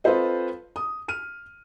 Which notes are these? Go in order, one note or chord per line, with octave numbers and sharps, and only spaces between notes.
C4 F4 A4 B4 C5 D#5
D#6
F6 D#7